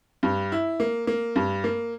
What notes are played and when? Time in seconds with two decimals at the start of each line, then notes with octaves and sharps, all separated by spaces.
0.23 G2
0.52 E4
0.80 A#3
1.07 A#3
1.36 G2
1.64 A#3